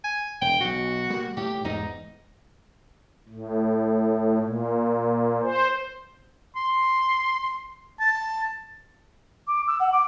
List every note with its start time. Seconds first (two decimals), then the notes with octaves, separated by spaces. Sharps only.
0.04 G#5
0.42 E1 G5
0.60 B1 B2 F#4
1.10 G3 A#3
1.37 A2 G4
1.64 E2 G#2 D#4
3.29 A2
4.42 A#2
5.43 C5
6.56 C6
8.00 A5
9.47 D6
9.67 E6
9.79 F#5
9.92 D6